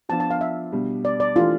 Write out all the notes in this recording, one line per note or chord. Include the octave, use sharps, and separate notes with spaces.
F3 B3 D4 F4 A5
A5
F5
E5
B2 G3 D4
D5
D5
E3 A3 D4 F4 G4